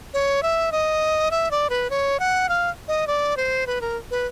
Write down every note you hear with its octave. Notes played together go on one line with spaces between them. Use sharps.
C#5
E5
D#5
E5
D5
B4
C#5
F#5
F5
D#5
D5
C5
B4
A#4
B4